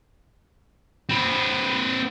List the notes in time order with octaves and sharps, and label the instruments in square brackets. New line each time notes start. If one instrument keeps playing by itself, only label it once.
[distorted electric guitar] C4 B4